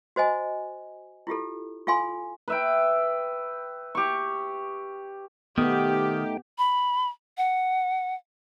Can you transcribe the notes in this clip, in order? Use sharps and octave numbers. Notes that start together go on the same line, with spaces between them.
F#4 C5 D#5 G#5
E4 F4 G4 A4
F4 A4 F5 G#5 C6
B4 E5 G5
G4 C#6
D#3 A3 B3 D#4 G4 G5
B5
F#5